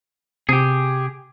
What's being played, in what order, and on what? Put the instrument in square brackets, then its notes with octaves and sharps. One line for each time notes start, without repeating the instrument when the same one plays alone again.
[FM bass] C3 [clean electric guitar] G4 G#4